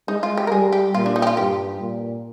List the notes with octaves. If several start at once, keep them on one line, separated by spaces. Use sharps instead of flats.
G#3 D#4
F4
G4
A#4
G3 G#4
G4
A#2 F4
D4
D#4
G4
F4
G2 G4
A#2